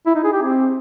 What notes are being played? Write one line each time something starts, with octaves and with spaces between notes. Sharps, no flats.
E4
D#4
G#4
G4
C4